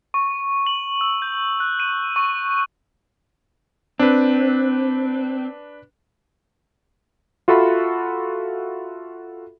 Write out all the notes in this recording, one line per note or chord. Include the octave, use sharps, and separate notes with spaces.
C#6
F#7
E6
G6
F#6
D#7
C#6
C4 D4 B4
F4 F#4 A4 E5 B5